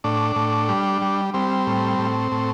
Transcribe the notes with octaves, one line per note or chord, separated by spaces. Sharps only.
A2 D4
A2
G3
G3
G3 C4
A2
A2
A2